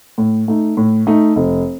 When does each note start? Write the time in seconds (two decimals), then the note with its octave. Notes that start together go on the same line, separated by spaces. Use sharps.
0.18 A2
0.48 A3 D#4
0.77 A2
1.07 A3 D#4
1.36 F1